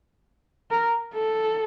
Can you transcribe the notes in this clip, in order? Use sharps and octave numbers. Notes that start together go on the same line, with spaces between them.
A#4
A4